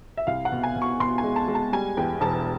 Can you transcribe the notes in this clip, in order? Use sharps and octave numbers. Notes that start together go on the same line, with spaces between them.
E5
C2 F5
F#5
B2
G#5
B2
C#6
B2 C6
G#5
G#3
A5
G#3
A5
G3 G#5
E2 G5
E1 A5